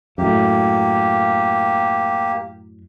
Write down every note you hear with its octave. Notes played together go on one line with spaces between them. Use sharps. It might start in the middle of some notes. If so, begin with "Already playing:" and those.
F#2 A2 A#3 G4